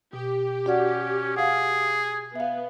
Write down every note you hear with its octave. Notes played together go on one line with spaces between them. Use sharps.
B2 G4
C#4 F#4 D5 F#5
G#4 F5 F#5
B3 E5 F5